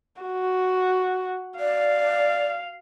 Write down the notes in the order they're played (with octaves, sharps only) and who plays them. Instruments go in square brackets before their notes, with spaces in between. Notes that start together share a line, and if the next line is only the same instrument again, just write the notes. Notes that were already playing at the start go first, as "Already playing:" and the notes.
[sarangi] F#4
[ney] D5 [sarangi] F5